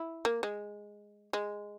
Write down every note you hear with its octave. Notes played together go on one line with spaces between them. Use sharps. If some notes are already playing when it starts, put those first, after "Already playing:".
Already playing: E4
A#3
G#3
G#3